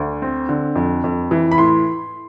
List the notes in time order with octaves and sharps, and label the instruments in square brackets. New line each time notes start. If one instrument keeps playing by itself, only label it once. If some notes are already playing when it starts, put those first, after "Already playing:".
Already playing: [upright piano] D2 D3
C4
D3
F2
F2
E3
B5
A2 C6